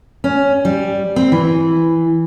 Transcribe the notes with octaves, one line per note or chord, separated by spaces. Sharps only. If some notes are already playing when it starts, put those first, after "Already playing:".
C#4
G3
C4
E3